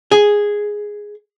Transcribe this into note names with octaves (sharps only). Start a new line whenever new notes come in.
G#4